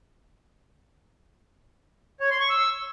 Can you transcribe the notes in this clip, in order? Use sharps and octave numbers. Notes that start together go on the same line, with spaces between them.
C#5
C6
C#6
E6